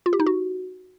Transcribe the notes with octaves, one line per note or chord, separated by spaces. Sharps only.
F4
G4
D#4
F#4